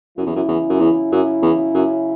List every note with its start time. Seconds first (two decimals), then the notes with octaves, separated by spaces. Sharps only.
0.18 F#2 C#3 F#3 C#4 E4
0.26 E2
0.36 F#2
0.48 E2
0.70 F#2
0.80 E2
1.12 F#2
1.42 E2
1.74 F#2